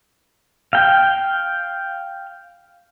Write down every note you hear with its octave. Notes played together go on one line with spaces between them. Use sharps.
F5 G5